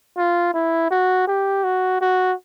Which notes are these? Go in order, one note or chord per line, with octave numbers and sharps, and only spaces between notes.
F4
E4
F#4
G4
F#4
F#4